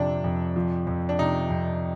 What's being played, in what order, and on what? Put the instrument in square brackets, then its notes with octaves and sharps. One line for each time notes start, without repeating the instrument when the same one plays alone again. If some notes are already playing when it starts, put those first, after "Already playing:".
Already playing: [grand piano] F2 C3 F3 [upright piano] D4
[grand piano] F2
F3
F2
[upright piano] D4
[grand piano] C3 [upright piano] D#4
[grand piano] F2